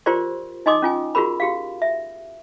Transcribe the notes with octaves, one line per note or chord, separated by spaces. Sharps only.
F4 G4 A#4 C5 D5 C6
D#4 D#5 G#5 C6 D6 D#6
C#4 F4 G#5
F4 F#4 G#4 A#4 B5
F#4 G4 F5
E5